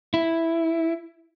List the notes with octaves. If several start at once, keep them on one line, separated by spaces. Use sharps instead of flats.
E4